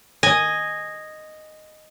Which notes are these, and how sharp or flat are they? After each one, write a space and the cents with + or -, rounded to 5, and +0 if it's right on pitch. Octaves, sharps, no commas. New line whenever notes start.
D#5 -5 G#5 +0